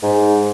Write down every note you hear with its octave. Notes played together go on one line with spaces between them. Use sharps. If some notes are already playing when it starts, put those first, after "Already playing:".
G#2